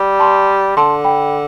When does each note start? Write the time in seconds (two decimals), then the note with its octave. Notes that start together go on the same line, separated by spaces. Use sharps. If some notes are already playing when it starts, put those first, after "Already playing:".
Already playing: G3
0.20 A5 C6
0.77 D3 A5 C6
1.04 G5 B5